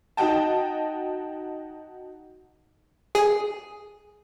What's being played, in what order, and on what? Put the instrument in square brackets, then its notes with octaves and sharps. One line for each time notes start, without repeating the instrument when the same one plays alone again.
[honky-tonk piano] D#4 F#4 D#5 G5 A5
[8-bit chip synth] G#4